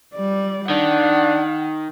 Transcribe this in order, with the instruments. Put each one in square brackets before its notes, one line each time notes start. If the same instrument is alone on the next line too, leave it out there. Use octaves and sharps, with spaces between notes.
[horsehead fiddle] G3 D5
[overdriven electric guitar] D#3 [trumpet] D4 [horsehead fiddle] F#5